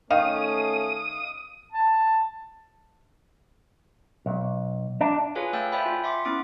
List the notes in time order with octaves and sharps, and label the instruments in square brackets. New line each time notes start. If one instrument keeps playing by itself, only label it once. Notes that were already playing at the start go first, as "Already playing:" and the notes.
[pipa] D#3 [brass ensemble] A3 C#4 [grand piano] F5 [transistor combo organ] D#6
[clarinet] A5
[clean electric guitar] B1
D4
[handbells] F4 G#4 B4 C#5 F5 G#5
A3 F5 G5 E6 G6 A6
C5 D5 E5 G5 G#5 B5
F4
E5 F#5 C6 D6
B3 C#4 E4 D6 D7